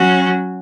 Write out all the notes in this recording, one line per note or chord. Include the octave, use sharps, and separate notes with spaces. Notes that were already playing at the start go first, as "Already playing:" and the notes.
Already playing: F#3 C#4 F#4